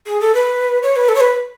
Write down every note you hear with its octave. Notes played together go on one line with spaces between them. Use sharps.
G#4
A4
B4
C#5
B4
A4
C#5
B4